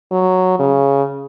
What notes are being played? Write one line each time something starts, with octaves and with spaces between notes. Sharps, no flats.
F#3
C#3